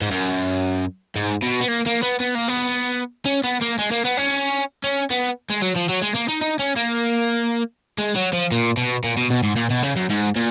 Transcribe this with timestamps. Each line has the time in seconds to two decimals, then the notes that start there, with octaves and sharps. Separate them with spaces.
0.01 G#2
0.11 F#2
1.16 G#2
1.42 B2
1.61 B3
1.68 A#3
1.86 A#3
2.03 B3
2.20 B3
2.35 A#3
2.48 B3
3.26 C#4
3.44 B3
3.61 A#3
3.79 G#3
3.91 A#3
4.05 B3
4.17 C#4
4.84 C#4
5.10 B3
5.50 G#3
5.62 F#3
5.75 F3
5.89 F#3
6.02 G#3
6.14 A#3
6.28 D#4
6.41 D#4
6.59 C#4
6.76 A#3
7.99 G#3
8.16 F#3
8.33 F3
8.52 A#2
8.77 B2
9.04 A#2
9.17 B2
9.30 B2
9.43 G#2
9.56 A#2
9.70 B2
9.83 C#3
9.96 F#2
10.10 G#2
10.36 A#2